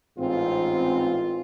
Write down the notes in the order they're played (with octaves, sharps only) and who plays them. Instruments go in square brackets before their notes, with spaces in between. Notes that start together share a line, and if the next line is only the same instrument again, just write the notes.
[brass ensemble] A1 F4 [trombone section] G#2 C4